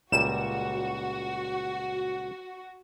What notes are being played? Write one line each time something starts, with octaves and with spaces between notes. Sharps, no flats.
C#2 A#2 G3 F#4 E7